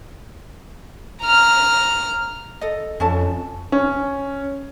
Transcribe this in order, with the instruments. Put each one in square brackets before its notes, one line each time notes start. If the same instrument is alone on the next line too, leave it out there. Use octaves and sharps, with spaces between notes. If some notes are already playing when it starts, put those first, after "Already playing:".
[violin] A#5 F6
[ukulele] A4 D#5
[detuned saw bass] F2 [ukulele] C#4 A4 A5
[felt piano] C#4